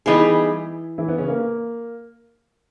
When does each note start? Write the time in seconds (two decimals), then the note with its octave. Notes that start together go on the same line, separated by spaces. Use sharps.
0.06 E3 G3 B3 D#4 E4 G#4
0.98 E3 E4
1.08 B3
1.18 C#3 C#4
1.28 A#3